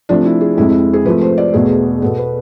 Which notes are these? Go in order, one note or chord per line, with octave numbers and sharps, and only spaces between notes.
C3 F3 A3 D4
E4
G#4
F2 C3 G#3 E4
E4
G#4
C3 F3 A3 B4
C5
D5
E2 B2 A3 G#4
B2 B3 A4
B4